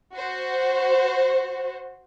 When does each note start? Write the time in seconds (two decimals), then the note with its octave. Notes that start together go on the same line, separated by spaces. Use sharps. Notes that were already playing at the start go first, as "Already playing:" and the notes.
0.15 F#4 C5